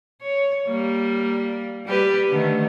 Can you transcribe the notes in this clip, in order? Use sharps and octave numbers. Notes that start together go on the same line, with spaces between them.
C#5
G3 A#3
G3 G4 B4
D3 D#3 A3